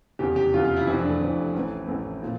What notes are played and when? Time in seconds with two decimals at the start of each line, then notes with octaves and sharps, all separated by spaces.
0.19 F1 E2 C#3 G4
0.36 G4
0.54 F1 E2 C#3 F4
0.65 F4
0.76 E4
0.87 F1 F2 E3 E4
0.99 D4
1.09 A3
1.21 F1 F2 E3
1.54 A1 A2 E3
1.87 A1 A2 E3 A3
2.22 A#2 F3